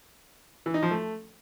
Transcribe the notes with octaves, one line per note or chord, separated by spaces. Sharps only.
E3
D#4
F3
A3